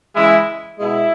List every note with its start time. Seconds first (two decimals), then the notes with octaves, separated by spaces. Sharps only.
0.14 C#3 E3 G#3 E4
0.79 B2 G#3 E4